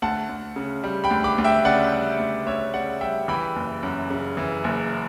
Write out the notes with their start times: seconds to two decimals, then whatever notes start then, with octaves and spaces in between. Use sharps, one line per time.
0.02 D2 F#5 A5
0.29 D2
0.56 C#3
0.84 G3
1.04 G5 B5
1.10 D2
1.24 B5 D6
1.38 D2
1.44 E5 G5
1.65 C#3 D5 F#5
1.92 G3
2.19 D2
2.47 D2 C#5 E5
2.74 C#3 D5 F#5
3.01 G3 E5 G5
3.28 E3 G5 B5
3.56 F#1
3.83 F#2
4.10 C#3
4.37 E3
4.64 F#1